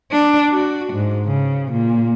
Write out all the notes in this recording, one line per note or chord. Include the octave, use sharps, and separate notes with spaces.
D4
F#4
G#2
C#3
A#2